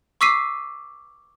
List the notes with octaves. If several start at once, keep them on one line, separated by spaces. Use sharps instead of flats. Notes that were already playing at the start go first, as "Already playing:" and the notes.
C#6 D6 E6 B6 C7 D#7